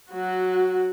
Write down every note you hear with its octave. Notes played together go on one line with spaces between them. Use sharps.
F#3 F#4